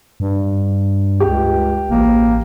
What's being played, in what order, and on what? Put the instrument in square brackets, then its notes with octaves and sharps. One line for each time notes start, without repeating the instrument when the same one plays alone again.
[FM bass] G2
[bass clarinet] C#2 [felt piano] G4
[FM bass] A1 [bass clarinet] A#3